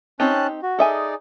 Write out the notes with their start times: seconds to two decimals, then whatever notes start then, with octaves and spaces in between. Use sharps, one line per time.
0.20 C4 C#4 D#4 G4 A5 F#6
0.63 F#4
0.79 D#4 G#4 A4 D5 E5 G#5